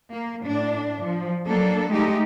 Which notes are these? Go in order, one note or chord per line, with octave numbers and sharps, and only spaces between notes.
A#3
A2 D4
F3
F#3 A#3 D4 A4
G#3 A3 D#4 G4